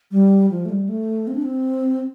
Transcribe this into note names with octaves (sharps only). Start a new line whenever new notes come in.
G3
F3
A3
G3
A3
C4
D4
C4